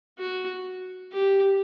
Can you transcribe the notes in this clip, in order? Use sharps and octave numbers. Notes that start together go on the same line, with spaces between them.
F#4
G4